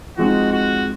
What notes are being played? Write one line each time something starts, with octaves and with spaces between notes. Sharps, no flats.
F3 G#3 C4 D#4 F#4
F#4